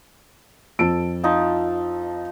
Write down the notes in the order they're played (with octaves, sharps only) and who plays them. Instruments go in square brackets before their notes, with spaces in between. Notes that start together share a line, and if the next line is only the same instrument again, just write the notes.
[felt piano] F2 D7 [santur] A4
[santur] F3 D#4